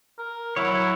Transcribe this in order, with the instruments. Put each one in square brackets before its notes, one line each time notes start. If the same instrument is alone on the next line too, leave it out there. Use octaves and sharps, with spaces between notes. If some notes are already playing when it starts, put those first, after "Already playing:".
[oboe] A#4
[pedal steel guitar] F#3 C#5 [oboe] E4